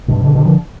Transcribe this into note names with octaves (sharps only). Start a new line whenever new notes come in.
G2 B2
B2 D3
B2 D3
D3 F3